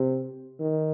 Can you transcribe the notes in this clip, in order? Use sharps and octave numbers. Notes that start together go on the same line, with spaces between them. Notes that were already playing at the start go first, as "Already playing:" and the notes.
Already playing: C3
D#3